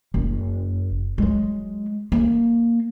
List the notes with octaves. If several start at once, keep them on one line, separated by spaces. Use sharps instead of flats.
F#1
F#3 G#3
A#3